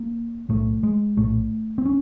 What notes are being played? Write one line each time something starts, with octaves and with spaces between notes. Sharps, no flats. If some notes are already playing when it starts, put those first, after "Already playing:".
Already playing: A#3
B1 A2 A3
G#3
A#1 A2 A3
C4
C#4